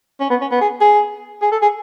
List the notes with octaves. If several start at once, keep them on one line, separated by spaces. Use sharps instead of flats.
C#4
B3
C#4
B3
G#4
G#4
G#4
A4
G#4